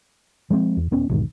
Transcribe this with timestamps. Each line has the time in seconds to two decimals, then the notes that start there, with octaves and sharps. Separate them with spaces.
0.50 F3 G#3 A3 C4
0.77 E2
0.91 D#1 B3 C#4
1.09 B1 E2 G#2 D#3